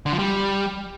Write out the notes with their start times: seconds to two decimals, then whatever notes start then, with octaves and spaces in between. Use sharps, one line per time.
0.06 D3
0.12 F3
0.19 G3